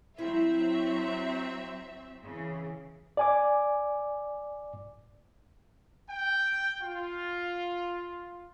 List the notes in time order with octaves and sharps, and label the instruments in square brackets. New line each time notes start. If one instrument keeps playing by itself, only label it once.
[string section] F#3 C4 E5 [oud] E4
[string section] C#3 E3
[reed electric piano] D5 G#5 D6
[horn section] G5
F4